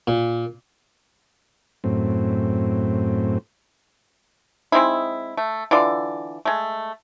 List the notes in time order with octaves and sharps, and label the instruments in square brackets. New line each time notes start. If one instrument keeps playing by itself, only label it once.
[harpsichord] A#2
[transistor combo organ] F#2 A2 C4
[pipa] G#3 C4 D#4 E4
A3
D3 E3 F4 D5
G#3 A3